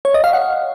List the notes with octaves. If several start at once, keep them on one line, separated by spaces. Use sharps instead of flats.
C#5
D#5
F5
F#5